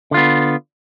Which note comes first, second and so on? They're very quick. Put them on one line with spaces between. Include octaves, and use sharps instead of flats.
D3 F4 B3